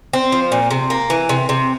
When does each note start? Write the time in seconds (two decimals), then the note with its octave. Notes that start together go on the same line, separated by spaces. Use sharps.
0.13 C4
0.32 F3
0.52 A#2
0.71 C3
0.90 A#3
1.10 E3
1.29 C3
1.49 C3